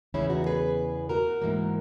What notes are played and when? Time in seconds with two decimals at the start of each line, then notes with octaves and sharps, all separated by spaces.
0.14 E2 C#3 E3 B3 C#4 E4
0.30 D#4 F#4
0.46 G#4 B4
1.09 F#4 A#4
1.42 G#2 E3 A#3